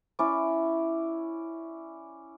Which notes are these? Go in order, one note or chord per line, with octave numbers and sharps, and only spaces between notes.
C#4 E4 D5